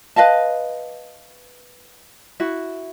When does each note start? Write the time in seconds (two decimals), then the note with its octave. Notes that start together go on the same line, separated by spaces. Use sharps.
0.16 B4 D#5 F5 A5
2.40 E4 F#4